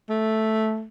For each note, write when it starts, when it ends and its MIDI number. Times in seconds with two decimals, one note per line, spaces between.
0.09 0.86 57